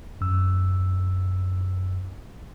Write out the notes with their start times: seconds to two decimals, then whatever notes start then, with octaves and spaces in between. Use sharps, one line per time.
0.21 F#2 E6